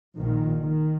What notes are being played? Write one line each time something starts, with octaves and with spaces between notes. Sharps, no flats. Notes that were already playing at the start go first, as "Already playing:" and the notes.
A#1 A#2 D#3
D#3